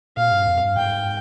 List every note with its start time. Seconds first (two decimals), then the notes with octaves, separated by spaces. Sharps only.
0.17 A#2 F5
0.32 G2
0.47 F2
0.61 G2
0.77 G#2 G5